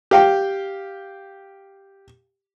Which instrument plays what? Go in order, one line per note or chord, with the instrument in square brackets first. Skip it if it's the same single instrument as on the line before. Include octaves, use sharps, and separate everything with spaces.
[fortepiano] G4 F5 G5